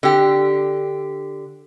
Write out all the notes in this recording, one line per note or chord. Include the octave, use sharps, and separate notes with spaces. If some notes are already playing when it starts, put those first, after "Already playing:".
D3 G4